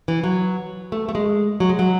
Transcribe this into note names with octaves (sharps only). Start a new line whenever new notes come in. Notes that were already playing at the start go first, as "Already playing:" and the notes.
E3
F#3
A3
A3
G#3
F#3
G#3
F#3